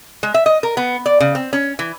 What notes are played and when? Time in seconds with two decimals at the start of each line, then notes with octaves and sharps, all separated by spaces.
0.23 G#3
0.34 E5
0.46 D#5
0.63 A#4
0.77 B3
1.06 D5
1.20 C#3
1.35 C4
1.53 C#4
1.79 E3